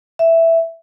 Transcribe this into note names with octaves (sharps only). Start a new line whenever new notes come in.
E5